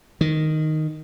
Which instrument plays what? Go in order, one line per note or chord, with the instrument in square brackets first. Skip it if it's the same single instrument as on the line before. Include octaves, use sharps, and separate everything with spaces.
[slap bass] D#3